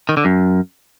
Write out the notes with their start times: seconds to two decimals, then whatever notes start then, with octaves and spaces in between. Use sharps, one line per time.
0.09 D#3
0.17 D3
0.25 F#2